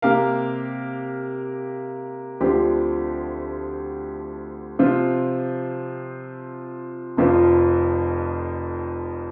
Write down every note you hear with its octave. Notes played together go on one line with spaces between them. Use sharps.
C3 A#3 G4 A#4 F5
D2 D3 F3 C4 G4
C3 F3 C4 F4
F1 F2 F3 C4 F4